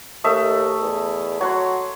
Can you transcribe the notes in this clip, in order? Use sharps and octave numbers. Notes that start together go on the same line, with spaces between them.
D#2 A3 D#5 E5
E2
F#3 C#5 F#5 C6